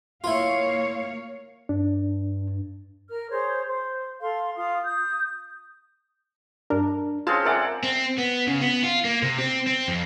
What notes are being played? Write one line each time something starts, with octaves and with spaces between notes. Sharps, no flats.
A#3 E4 F4 C#5 F5
G2 D4
A#4 F6
G#4 C5 C#5
C5
A4 F5 C6
F4 F5 C6 D#6
D#6 G6
G2 D4 A#4
G#3 C4 C#4 F4 F5 A5
A4 A#4 D5 E5 F#5 G#5
C4
B3
C#3
B3
F4
A#3
C3
C4
C4
F2